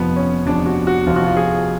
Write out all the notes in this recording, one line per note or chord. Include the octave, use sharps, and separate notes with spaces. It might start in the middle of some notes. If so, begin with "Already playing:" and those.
Already playing: F1 F2 F3 B3
C#4
F1 F2 F3 D4
F#4
F#4
F1 F2 F3 F4
F#4
F4
G#4